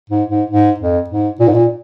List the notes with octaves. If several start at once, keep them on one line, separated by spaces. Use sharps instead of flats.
G#2
G#2
G#2
F2
G#2
A#2
G#2
A#2